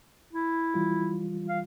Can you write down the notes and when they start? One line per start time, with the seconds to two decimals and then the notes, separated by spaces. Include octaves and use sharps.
0.33 E4
0.74 E3 G3 F4
1.49 F5